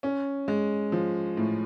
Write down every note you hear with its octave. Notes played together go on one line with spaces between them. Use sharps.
C#4
G#3
F3
A2